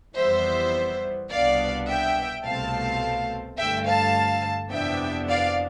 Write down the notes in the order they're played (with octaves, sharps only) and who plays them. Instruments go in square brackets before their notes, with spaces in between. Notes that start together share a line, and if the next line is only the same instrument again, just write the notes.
[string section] F2 E3 G3 B3 C5 E5
C2 B2 B3 D4 D5 F5
E5 G5
C2 B2 A3 C4 F5 A5
G2 D3 A3 E5 G5
F5 A5
F2 C3 E3 B3 D4 E5 G5
D5 F5